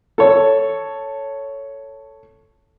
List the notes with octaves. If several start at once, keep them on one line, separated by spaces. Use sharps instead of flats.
A4 C#5